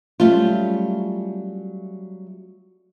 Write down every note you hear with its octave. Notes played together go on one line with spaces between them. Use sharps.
F#3 G3 A3 C#4 F4